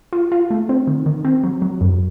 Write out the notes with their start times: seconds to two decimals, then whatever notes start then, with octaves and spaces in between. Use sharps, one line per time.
0.13 F4
0.32 F4
0.51 A3
0.69 C4
0.87 D#3
1.06 D#3
1.25 C4
1.44 F#3
1.62 F#3
1.81 F#2